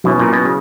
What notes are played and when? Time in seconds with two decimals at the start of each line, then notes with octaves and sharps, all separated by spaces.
0.04 B2 F#3 C#4 E4
0.19 A#2
0.33 B2
0.45 C#3